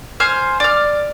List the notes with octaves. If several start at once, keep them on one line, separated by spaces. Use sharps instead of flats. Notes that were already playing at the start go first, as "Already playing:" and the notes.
C5 G#5 F6
D5 F6